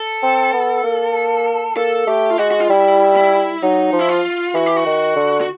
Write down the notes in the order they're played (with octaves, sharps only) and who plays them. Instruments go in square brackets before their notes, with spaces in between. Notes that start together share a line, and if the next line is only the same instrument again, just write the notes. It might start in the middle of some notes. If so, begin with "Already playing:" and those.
Already playing: [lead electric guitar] A4
[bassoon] C4
B3
A#3
[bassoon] A#3 [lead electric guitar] A4
[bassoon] A3 [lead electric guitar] G4
[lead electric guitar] F4
[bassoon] G#3 [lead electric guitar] F#4
[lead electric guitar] F#4
F4
[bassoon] G3 [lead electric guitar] E4
[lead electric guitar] E4
[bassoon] F#3 [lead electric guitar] D#4
[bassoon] F3
[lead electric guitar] E4
F4
[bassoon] E3 [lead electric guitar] F#4
[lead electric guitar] G4
F#4
[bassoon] D#3
D3
[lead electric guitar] F#4